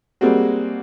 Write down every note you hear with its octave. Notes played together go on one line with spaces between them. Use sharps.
G3 G#3 A#3 C4 F#4